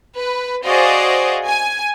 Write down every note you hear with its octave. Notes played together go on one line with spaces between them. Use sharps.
B4
F#4 G#4 C5 D5 D#5 F5
G#5